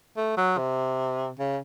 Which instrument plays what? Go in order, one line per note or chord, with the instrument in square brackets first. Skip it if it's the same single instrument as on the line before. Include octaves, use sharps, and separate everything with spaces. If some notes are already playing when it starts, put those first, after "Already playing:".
[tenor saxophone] A3
F#3
C3
C#3